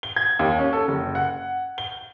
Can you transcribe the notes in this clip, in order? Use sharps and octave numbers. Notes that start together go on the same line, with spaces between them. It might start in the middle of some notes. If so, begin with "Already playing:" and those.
G7
G#6
D#2
C#4
A4
F#1
F#5
G7